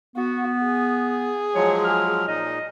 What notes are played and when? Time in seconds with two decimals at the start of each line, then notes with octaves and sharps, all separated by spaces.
0.16 B3 F#4
0.64 G#4
1.55 F3 F#3 G#3 C#5
1.84 F6
2.28 A#2 D#4 D#5